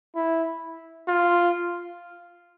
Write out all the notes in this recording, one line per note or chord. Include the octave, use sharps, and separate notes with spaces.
E4
F4